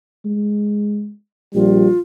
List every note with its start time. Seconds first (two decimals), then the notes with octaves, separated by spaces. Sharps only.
0.25 G#3
1.54 A#1 G3 F4